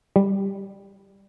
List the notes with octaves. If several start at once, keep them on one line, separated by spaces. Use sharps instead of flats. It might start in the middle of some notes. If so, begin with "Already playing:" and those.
G3